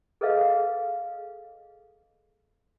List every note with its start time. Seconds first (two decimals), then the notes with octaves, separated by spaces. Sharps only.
0.21 G#4 A4 B4 D#5 F5